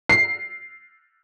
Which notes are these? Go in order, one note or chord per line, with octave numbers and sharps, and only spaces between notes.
C7